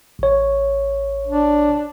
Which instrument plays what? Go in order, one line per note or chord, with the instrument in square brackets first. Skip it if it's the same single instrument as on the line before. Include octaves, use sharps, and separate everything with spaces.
[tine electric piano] A1 C#5
[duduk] D4